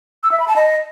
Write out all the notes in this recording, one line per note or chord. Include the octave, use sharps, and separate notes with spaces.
E6
E5
B5
A5
D#5